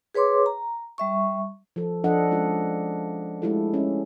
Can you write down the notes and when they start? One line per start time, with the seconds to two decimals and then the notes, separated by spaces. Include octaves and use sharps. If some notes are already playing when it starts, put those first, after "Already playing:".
0.14 G#4 B4 C#5 C6 D6
0.46 A#5
0.98 G3 E5 C#6
1.76 F3 A4
2.04 F3 D4 A4 D#5 F#5
2.31 G#3 C#4 F4
3.42 G#3 A3 E4 F4 G4 A4
3.74 C#4 E5